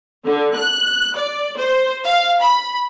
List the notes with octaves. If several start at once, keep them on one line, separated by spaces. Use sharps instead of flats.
D3
F#6
D5
C5
F5
B5